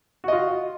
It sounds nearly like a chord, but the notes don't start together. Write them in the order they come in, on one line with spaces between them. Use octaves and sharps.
F#4 D#5 F4